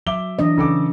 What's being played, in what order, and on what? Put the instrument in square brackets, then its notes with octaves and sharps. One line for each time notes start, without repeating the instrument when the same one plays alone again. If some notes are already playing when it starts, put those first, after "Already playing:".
[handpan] F#3 [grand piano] E5 D6 G7
[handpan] E3 D4 D#5
[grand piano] C#3 A4 D6